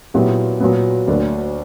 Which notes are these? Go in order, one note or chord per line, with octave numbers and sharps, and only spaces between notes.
A#2 F#3 B3 E4 G4
A#2 F#3 B3
D2 D3 F#3 A#3 D4